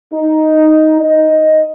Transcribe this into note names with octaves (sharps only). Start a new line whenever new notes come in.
D#4
D#5